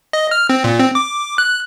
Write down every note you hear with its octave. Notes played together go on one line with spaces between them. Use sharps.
D#5
F6
C4
A#2
C4
D6
F#6